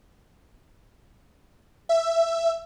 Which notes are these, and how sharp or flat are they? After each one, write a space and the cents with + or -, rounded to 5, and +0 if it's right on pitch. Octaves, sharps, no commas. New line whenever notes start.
E5 +15